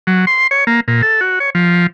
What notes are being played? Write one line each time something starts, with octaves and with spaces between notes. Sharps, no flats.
F#3
C6
C#5
A#3
A#2
A4
F#4
C#5
F3